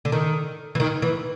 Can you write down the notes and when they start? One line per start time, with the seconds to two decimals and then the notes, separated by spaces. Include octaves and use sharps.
0.05 D3
0.12 D#3
0.75 E3
0.80 D#3
1.02 E3